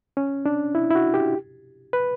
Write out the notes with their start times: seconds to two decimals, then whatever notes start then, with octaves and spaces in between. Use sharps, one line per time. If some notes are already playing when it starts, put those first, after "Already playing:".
0.17 C#4
0.46 D4
0.75 E4
0.91 E4
0.95 F#4
1.14 G4
1.93 B4